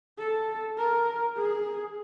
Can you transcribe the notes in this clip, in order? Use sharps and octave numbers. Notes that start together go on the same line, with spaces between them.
A4
A#4
G#4